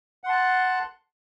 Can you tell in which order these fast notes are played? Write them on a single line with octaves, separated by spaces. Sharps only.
F#5 C6 A5 F#6